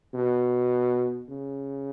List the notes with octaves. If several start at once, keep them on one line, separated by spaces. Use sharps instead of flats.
B2
C#3